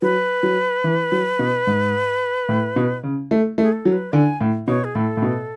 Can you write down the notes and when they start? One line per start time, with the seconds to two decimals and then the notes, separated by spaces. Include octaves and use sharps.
0.02 F#3 B4
0.43 F#3
0.84 E3
1.12 F#3
1.39 B2
1.67 G#2
2.49 A2
2.76 B2
3.03 C#3
3.31 A3
3.58 A3
3.61 G#4
3.72 A4
3.85 F#3
3.92 B4
4.13 D3 G#5
4.41 A2
4.68 B2 C#5
4.84 G#4
4.95 A2 A4
5.17 A2
5.22 B2